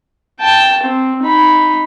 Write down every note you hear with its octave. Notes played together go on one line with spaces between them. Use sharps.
G5 A5
C4
D#4 B5